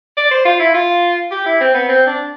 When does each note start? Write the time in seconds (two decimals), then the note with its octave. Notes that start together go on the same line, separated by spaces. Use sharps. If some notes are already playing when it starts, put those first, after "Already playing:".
0.17 D5
0.31 C5
0.45 F4
0.60 E4
0.74 F4
1.31 G4
1.46 E4
1.60 C4
1.74 B3
1.89 C4
2.07 D4